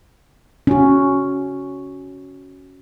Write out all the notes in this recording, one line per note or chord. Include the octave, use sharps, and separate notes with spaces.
C#4 F#4